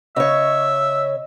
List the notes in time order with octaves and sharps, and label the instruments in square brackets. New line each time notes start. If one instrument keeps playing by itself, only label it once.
[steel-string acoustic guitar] C#3 C#5 [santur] D#5 [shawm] E5